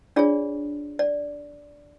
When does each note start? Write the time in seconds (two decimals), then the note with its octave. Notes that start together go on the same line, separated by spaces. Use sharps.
0.16 D4 F4 G#4 C#5 D5
0.99 D5